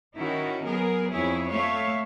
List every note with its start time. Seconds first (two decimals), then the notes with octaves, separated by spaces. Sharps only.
0.17 D#3 C#4 D#4 E4 F#4
0.63 F#3 B3 G#4 A#4
1.12 F2 E4 G#4 C#5
1.50 A3 C#5 E5 F5